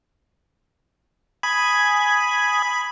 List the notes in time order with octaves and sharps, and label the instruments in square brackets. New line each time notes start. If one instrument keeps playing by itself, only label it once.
[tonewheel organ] G#5 D#6 G#6 [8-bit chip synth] B5